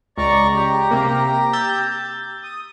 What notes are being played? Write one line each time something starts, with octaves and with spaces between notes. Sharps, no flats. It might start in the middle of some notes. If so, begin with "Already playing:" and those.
C#2 D5 A#5 C#6
G4 A#5
C3 A#3
E6 G6 A6
D#6